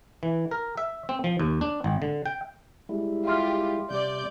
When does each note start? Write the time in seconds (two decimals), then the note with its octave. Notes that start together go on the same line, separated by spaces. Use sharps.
0.23 E3
0.51 A#4
0.77 E5
1.09 C4
1.24 F3
1.39 D#2
1.61 D4
1.84 G#1
2.02 D3
2.26 G5
2.89 G3 G#3 E4
3.25 F4 G4 E5 C6 F6
3.90 C3 G3 D5 G6